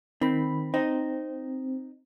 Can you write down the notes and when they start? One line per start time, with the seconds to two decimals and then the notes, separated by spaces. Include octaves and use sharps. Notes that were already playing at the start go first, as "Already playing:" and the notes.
0.21 D#3 C4 B5
0.74 C4 D#4